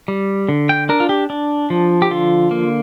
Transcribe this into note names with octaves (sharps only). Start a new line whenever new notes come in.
G3
D3
G5
D4 A#4
F4
G4
D4
F3
G4
D3 F4
A#3